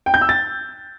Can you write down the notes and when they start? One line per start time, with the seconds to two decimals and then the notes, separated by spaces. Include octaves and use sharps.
0.06 G5
0.14 G6
0.21 E6
0.29 A6